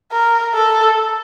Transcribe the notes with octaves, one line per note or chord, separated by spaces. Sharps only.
A#4
A4